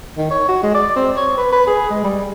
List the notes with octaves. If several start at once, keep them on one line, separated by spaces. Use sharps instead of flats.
D#3
C#5
F#4
G#3
D5
C4
C#5
B4
B4
G#4
G#3
G3